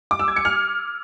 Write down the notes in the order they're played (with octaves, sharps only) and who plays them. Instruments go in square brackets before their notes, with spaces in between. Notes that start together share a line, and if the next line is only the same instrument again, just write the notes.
[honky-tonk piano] D6
E6
G#6
C#7
F6